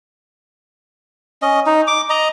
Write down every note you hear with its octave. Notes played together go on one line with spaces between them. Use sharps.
C#4 D#5
D#4
D6
D#5 A#5